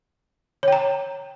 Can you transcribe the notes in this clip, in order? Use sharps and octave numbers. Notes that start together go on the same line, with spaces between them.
C#5 G5 A#5